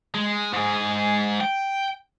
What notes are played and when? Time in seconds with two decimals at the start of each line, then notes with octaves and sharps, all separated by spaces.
0.15 G#3
0.53 G#2 G#4
1.40 G5